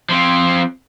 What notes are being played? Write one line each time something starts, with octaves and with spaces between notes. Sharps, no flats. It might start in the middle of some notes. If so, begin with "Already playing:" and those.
F3 C4